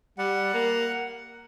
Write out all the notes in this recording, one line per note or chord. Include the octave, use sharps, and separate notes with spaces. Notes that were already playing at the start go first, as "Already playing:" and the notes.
G3 F#5
A#3